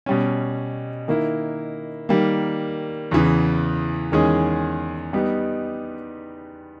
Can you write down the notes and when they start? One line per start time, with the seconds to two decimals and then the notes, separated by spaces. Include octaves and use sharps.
0.06 B2 G3 C#4
1.08 D#3 A#3 E4
2.09 D#3 G3 A#3
3.11 E2 C#3 E3
4.12 E2 D#3 G#3 C#4 G#4
5.13 G3 B3 D#4 G4